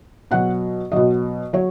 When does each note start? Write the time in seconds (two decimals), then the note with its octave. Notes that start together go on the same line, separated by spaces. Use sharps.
0.31 B2 F#3 F#5
0.92 B2 F#3 D#5
1.53 F#3 C#5